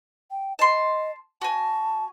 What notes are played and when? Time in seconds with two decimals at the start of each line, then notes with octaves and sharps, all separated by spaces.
0.31 G5
0.59 D#5 A5 C6
1.41 F#4 G#5 A5